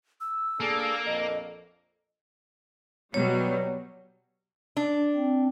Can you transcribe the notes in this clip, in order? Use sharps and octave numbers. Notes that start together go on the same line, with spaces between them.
E6
A#3 D4 G#4 A4
A#1 F2 A4 D#5
B2 F#3 G3 B3 C#5
D4
C4